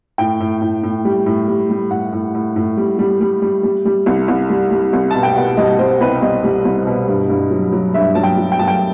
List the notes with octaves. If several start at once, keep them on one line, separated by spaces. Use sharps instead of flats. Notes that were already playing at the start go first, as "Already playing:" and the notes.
A2 G5
A2
A2
A2
G3
A2
G3
G3
A2 F#5
A2
A2
A2
G3
G3
G3
G3
G3
G3
C2
C2
G3
G3
C2
B2 A5
G5
B2 F#5
G3 D#5
G3 C5
C2 B4
C2 D#5
G3
C2
B2
G2
G2
F#3
F#3
G2 E5
F#3 A5
G5
F#3
G5
F#3 A5
G5